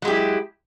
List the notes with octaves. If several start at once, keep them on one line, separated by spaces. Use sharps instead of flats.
F#3 G#3 E4 G4